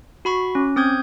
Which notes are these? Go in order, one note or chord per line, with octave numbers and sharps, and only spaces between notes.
F#4 B5 C#6
C#4
C4 D#6 G6 G#6